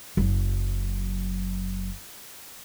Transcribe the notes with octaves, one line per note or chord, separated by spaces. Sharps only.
F#1 F#3